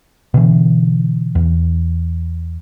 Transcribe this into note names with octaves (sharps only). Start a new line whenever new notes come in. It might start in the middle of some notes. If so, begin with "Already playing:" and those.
B2 D3 E3
E2